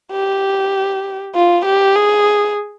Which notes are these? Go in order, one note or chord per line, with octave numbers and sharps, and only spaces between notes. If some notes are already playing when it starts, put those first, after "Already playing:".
G4
F4
G4
G#4